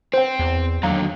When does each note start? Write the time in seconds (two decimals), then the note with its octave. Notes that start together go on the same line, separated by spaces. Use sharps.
0.14 C4 C5 G5
0.39 E2
0.83 D#2 D3 F#3 F5 A#5